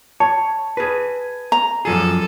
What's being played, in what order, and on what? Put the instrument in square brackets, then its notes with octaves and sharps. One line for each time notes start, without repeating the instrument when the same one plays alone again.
[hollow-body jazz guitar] C#5 [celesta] A5
[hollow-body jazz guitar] G#4 B4
[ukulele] A#5
[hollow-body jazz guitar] F#2 F3 G#4 [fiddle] A4